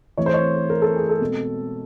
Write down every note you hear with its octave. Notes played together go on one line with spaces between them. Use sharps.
E3 A3 C4 C#5
C5
C#5
A#4
A4
G#4
A4
B2 G#3 C4